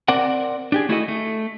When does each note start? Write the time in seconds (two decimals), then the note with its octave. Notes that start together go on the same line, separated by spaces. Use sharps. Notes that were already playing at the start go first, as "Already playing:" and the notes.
0.08 C4 A#4 D5 F#5
0.72 D4 G4 G#4
0.89 A3 D4 E4 F#4 A4 D#5
1.08 A3